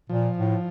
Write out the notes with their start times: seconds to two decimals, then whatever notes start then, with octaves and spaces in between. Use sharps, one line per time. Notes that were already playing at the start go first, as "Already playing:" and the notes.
0.10 A#2 F3
0.38 A2